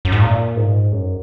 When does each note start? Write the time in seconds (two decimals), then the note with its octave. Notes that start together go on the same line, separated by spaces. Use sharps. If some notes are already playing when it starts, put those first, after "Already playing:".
0.05 F#2
0.12 G#2
0.21 A#2
0.56 G#2
0.92 F#2